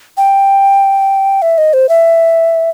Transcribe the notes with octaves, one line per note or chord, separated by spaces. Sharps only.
G5
E5
D#5
C5
E5